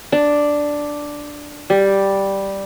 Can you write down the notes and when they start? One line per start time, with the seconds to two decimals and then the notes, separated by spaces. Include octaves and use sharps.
0.12 D4
1.70 G3